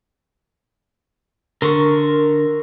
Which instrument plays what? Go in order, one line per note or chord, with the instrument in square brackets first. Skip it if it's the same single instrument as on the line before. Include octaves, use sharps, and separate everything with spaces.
[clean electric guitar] D3 [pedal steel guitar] A#4 C6 C#6